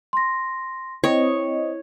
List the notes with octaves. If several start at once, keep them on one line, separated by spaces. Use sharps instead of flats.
C6 A#6
C4 E4 C#5 D#5